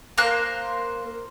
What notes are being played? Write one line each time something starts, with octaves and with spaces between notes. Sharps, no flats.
A#3 A#4 C5 F#6